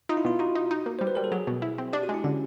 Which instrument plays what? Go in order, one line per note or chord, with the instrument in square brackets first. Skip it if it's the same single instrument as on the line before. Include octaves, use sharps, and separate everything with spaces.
[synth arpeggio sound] D#4 [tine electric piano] F4
[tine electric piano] E4
[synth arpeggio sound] B2 [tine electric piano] F4
[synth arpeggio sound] D#4 [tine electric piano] F#4
[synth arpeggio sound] D#4
D#4
A#3
[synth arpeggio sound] G3 [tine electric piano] C5
[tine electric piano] B4
[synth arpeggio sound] G3 [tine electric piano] A#4
[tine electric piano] A4
[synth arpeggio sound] F#3 [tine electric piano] G#4
[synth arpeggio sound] B2
E4
C4
[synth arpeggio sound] D4 [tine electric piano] G4
[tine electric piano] F#4
[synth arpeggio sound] G#3
[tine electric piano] E4
[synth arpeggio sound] D3 [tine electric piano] C#4